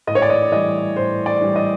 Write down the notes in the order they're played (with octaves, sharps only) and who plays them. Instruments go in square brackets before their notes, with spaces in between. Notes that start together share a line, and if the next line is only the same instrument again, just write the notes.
[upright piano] A2 D#5
C#5
D5
D#5
E3 G3 D#5
A2 C5
D5
E3 G3
D#5